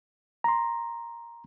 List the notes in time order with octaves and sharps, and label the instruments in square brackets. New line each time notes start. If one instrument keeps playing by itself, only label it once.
[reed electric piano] A#5 C6